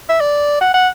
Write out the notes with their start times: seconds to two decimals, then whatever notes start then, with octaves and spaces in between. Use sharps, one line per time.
0.10 E5
0.21 D5
0.61 F#5
0.74 F#5